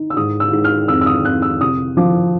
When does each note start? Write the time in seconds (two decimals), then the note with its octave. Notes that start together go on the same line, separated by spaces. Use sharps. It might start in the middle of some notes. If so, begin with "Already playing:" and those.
Already playing: D#4
0.10 E6
0.17 G#2 D#6
0.40 E6
0.53 G#2
0.64 F6
0.88 F2 E6
1.01 E6
1.06 D#6
1.24 F2 F#6
1.42 E6
1.61 C3 D#6
1.97 F3 D6